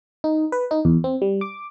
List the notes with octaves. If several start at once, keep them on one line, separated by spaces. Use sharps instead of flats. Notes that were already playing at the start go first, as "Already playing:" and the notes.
D#4
B4
D#4
E2
C4
G3
D6